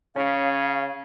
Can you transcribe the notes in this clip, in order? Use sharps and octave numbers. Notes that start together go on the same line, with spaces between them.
C#3 C#4 F5